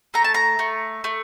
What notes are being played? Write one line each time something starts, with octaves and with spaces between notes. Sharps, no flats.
A3 A#5
A5
A#5
A3
A3